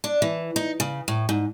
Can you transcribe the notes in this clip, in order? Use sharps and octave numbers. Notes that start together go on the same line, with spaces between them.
D4
E3
D#4
C#3
A2
G#2